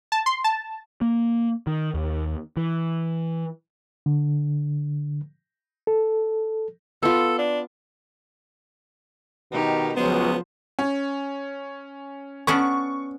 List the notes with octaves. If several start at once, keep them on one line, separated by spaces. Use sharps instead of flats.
A5
C6
A5
A#3
D#3
D#2
E3
D3
A4
B3 F4 A4
D4
B2 D#3 D#4 G4
C#2 F3 F#3 B3 C5
C#4
B3 C#4 D4 C#6